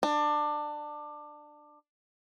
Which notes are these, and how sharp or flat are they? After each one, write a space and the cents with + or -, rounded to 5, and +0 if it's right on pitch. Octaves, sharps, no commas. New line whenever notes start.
D4 +20